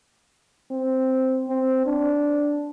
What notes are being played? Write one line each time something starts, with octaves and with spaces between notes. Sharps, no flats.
C4
C4
D4